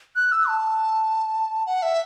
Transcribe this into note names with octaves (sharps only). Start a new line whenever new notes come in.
F#6
E6
A5
F#5
E5